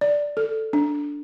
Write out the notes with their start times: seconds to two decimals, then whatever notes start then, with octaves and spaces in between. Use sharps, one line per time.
0.01 D5
0.37 A4
0.73 D4